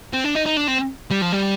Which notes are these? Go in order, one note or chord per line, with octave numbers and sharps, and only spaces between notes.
C4
D4
D#4
D#4
D4
C4
G3
F3
G3